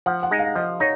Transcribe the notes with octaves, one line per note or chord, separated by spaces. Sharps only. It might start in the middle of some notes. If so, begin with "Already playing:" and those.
F3 F#5
F#5
G#3 D#4
F5
F3 D#5
D#4 C#5